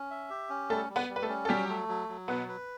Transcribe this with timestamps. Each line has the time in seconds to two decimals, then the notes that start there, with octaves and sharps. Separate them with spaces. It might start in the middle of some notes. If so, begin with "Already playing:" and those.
Already playing: C#4
0.11 E5
0.30 G4
0.50 C#4
0.70 G3 A3 A4
0.89 G3
0.96 B3 B4
1.09 G3
1.16 B4
1.22 A3 A4
1.29 C#4
1.45 A4
1.49 F#3 G3 G4
1.69 A3
1.89 F#3
2.09 F#3
2.28 B2 B3 B4
2.48 B4